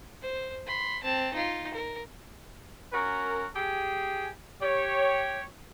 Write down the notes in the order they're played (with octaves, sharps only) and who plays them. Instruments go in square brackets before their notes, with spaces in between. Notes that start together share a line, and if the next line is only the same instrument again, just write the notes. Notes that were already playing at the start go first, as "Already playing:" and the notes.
[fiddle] C5
B5 C6
C4 A5
D#4 F4
A#4
[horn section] C#4 F#4 A#4
G4 G#4
G4 C#5